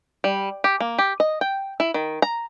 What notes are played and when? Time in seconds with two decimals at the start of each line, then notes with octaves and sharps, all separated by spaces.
0.24 G3
0.64 G4
0.80 A#3
0.99 G4
1.20 D#5
1.41 G5
1.80 E4
1.94 D#3
2.22 A#5